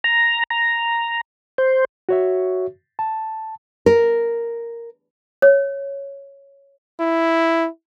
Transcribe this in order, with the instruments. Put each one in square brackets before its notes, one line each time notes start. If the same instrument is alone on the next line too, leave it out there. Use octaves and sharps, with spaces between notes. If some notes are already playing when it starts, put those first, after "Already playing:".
[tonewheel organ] A#5
A#5
C5
[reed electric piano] F#4 C#5 E5
A5
[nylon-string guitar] A#4
[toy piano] C#5
[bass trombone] E4